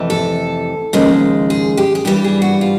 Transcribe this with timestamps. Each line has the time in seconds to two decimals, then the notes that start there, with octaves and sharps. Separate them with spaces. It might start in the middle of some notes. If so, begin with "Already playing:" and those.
Already playing: F2 C3 E3 A3
0.10 A4
0.93 D#2 C#3 F3 G#3
1.50 G#4
1.77 G4
1.95 G#4
2.05 G2 E3 G3 G4
2.24 G#4
2.42 F#4
2.61 F4